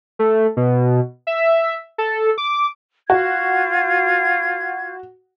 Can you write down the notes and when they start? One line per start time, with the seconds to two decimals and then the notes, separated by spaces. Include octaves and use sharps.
0.19 A3
0.57 B2
1.27 E5
1.98 A4
2.38 D6
3.10 F4 F#4 G#6